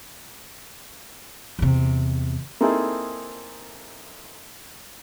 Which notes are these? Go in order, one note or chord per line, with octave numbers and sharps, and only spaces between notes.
E2 C3
A#3 C4 D#4 E4 G#4 A4